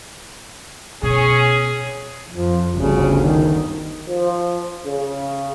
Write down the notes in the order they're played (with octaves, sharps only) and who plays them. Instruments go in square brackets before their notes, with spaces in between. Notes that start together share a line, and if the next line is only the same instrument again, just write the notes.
[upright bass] B2 [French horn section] C#4 G#4
[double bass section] F2 [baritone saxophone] F3
[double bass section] G1 D2 [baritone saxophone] C#3
[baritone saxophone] D#3
[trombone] F3
C#3